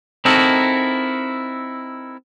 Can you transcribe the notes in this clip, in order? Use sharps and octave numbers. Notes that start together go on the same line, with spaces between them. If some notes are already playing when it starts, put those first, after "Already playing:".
C4 D#4 E4 F#4 A4 A#4